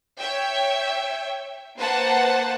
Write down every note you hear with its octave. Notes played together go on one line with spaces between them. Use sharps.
C#5 E5 G5
A#3 B4 C5 F#5 A5